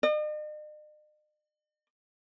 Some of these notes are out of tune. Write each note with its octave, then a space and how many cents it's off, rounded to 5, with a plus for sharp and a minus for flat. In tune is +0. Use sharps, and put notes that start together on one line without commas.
D#5 -45